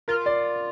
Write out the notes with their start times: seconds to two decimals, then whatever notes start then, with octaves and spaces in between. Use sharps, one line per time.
0.08 F4 A#4
0.26 D5